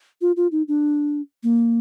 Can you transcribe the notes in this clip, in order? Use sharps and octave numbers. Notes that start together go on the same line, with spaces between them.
F4
F4
D#4
D4
A#3